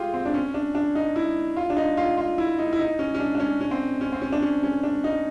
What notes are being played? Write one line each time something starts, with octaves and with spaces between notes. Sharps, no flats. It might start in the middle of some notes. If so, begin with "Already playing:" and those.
Already playing: F4 G4 G#4
C4
D4
C#4
D4
D4
D#4
E4
F4
D4
D#4
F4
F4
E4
D#4
E4
D#4
C#4
C#4
D4
D4
C#4
C#4
C4
C#4
C4
C#4
D4
C#4
C#4
D4
D#4